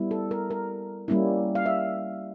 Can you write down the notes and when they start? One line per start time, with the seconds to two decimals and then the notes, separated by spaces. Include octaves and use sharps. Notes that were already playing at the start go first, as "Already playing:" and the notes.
Already playing: G3 B3 E4
0.11 A4
0.31 A#4
0.50 A#4
1.08 G3 A#3 C#4 E4
1.55 F5
1.66 E5